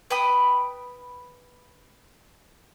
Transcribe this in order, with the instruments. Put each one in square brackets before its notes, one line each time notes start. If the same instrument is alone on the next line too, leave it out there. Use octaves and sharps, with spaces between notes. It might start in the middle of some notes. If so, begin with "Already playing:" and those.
[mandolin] B4 G5 B5 D#6